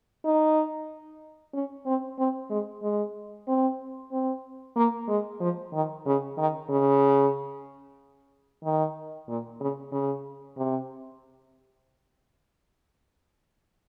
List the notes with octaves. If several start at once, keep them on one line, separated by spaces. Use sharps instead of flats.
D#4
C#4
C4
C4
G#3
G#3
C4
C4
A#3
G#3
F3
D#3
C#3
D#3
C#3
D#3
A#2
C#3
C#3
C3